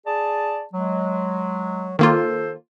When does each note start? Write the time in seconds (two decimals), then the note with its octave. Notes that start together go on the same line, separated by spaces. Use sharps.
0.06 G#4 D5 A5
0.73 F#3 G#3
1.99 D#3 A#3 F4 A4 C5